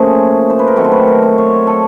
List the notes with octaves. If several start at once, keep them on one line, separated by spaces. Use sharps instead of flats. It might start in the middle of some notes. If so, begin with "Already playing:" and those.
Already playing: A#2 F3 A3 C#4 G#4
C5
B4
A#4
D#3 F#3 A3 C4 A4
C5
B4
A#4
C5
C#5
A4